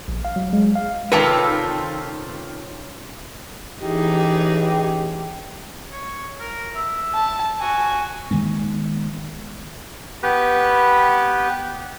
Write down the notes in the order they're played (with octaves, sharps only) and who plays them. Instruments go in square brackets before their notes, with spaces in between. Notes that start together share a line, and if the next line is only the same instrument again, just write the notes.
[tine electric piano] A#1
F5
F#3
G#3
F5
[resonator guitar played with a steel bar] C3 A4 A5 [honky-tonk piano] D#3 [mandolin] C4 C#4 F4 [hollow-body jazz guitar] B4
[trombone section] A1 G4 [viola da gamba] E3 D#4 G#4
[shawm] C#5
A#4
E5
[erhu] A5
[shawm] F#4 [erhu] G#5
[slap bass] D#3 G#3 A#3 B3
[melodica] B3 G4 B4